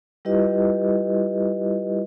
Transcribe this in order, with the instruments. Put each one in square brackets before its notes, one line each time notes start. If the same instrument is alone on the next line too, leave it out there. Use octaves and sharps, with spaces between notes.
[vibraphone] G3 E4 F4 G4 B4 D#5